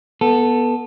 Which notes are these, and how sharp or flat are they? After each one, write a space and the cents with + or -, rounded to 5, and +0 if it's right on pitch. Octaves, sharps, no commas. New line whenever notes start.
B3 -15 A4 +0